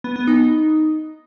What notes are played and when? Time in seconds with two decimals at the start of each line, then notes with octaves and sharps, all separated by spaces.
0.04 B3
0.16 B3
0.27 D#4